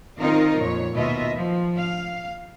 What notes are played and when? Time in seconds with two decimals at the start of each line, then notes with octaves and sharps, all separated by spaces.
0.19 D#3 C4 D#4 F4 A#4 D#5
0.60 F2 A#2 C#5
0.95 D#2 B2 F4 D#5 E5
1.35 F3
1.78 F5